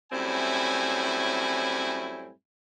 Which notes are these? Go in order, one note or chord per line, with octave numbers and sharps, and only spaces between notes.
F#2 A2 G3 C4 E4 G#5